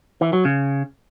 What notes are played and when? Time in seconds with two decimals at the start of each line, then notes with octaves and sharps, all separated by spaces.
0.21 E3
0.33 F#3
0.45 C#3